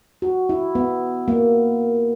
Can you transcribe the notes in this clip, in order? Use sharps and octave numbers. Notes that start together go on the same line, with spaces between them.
F#4
E4
B3
A#3